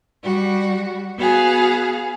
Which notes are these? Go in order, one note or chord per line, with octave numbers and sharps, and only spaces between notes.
G3 F#4
B3 F#4 G#4 F5